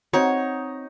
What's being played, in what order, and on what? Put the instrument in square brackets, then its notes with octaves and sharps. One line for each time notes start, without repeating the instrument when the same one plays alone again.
[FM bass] C4 [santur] D#4 [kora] F#4 [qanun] C#5